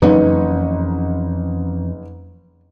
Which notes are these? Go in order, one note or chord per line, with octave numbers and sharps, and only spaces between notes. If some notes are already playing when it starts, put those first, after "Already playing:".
F#1 F2 E3 C#4 D#4 B4